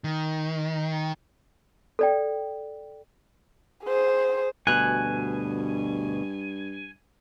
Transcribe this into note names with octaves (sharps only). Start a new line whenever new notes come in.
D#3
A4 D5 G5
G#4 C5
D2 G2 B2 G#5 F#6